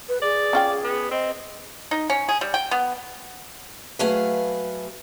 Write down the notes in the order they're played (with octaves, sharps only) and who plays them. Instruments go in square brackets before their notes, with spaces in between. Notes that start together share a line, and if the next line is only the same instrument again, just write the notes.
[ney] B4
[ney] G#4 [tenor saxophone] D5
[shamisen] C#4 F4 G5
[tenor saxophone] B3
[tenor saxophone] C4 [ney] D#5
[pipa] D#4
C#4
G#4
G3
G5
B3
[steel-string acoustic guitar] F#3 A3 G#4 B4 F5